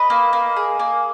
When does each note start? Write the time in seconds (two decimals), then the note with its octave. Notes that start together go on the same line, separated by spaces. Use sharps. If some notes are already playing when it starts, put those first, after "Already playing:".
Already playing: B4 D#5
0.10 A#3
0.33 A#3
0.56 G#4
0.79 A#3